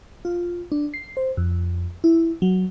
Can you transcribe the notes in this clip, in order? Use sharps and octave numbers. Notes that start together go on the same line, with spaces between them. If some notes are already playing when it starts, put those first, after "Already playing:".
F4
D4
C7
C5
F2
E4
F#3